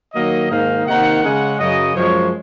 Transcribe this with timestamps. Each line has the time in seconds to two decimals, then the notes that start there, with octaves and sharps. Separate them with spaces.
0.14 D#3 F#3 A#3 D#5
0.50 G#2 D#3 A#3 D#4 F5
0.86 C3 D#3 A#3 D#4 F#5
1.23 C#3 G#3 C#4 F#5
1.60 F#2 C#3 F#3 D#5
1.95 F#2 F3 G#3 C#5